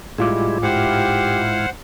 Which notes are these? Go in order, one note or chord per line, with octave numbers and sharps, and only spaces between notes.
A2 G3 G#3 E4 F4 D6
G#2 E4 G4 C5 F5 F#5